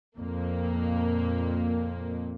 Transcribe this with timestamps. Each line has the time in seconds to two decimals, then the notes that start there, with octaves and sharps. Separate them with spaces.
0.18 F2 A#2 A#3